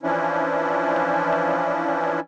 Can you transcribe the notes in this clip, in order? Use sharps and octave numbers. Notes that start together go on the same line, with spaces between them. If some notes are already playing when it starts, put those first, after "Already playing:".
E3 F3 C#4 D4 E4